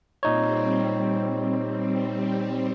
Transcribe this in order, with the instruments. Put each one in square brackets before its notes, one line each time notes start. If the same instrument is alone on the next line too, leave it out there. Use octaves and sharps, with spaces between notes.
[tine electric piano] A#2 D#4 C#5 [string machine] G3 C4